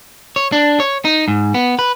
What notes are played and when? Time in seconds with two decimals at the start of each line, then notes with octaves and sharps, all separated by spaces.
0.36 C#5
0.52 D4
0.80 C#5
1.05 D#4
1.28 G#2
1.54 B3
1.79 B4